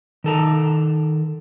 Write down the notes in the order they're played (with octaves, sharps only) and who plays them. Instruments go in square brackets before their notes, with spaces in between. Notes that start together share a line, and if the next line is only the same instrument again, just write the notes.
[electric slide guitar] D#3 A4 A#5